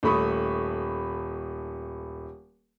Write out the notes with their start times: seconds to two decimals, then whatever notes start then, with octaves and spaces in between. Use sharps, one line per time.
0.03 D#1 A3 B5 C#6 D#6